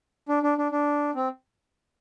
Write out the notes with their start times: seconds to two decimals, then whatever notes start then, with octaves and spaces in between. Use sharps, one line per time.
0.29 D4
0.43 D4
0.58 D4
0.72 D4
1.15 C4